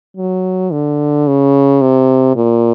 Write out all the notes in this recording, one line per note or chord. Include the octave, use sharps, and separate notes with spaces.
F#3
D3
C#3
C3
A#2